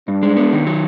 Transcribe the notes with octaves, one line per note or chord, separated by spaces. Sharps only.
G2 D4
G#3
B3
D#3
F#3